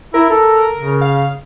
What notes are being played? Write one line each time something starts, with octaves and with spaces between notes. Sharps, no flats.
E4 A#4
A4
C#3
F5